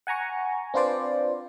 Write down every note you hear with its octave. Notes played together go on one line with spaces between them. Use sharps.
F#5 G#5 A#5 C#6
C4 D4 F4 B4 C5 D5